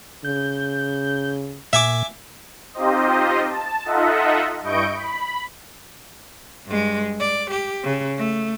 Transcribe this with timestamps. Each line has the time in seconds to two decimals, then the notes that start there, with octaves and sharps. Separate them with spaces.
0.25 C#3 G6
1.73 A#2 E5 G#5 D6
2.74 C4 D#4 F4 G4 C5 D#5
3.48 A5
3.85 D#4 F4 A4 D#5 E5 F#5
4.62 G2 E4 D#5 C#6 G6 D7
4.95 B5
6.66 G2 G#3
7.20 D5
7.51 G4
7.84 C#3
8.17 A3